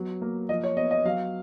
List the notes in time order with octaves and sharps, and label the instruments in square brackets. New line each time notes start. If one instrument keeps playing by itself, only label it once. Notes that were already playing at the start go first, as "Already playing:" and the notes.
Already playing: [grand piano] F#3 B3
A#3
F3 D#5
C#5
B3 D#5
D#5
F#3 F5